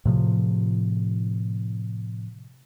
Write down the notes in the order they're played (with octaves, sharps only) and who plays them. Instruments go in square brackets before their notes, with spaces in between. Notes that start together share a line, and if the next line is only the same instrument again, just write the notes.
[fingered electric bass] A2 C3 F3